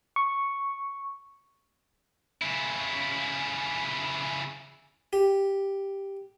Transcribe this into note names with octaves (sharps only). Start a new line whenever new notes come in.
C#6
C#3 E4
G4